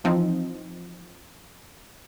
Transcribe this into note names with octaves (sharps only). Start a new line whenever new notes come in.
E3 F3 C4 D#4